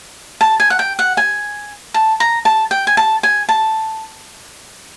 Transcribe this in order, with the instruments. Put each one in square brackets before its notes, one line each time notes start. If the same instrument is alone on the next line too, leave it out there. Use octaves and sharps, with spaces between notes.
[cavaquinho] A5
G#5
F#5
G5
F#5
G#5
A5
A#5
A5
G5
G#5
A5
G#5
A5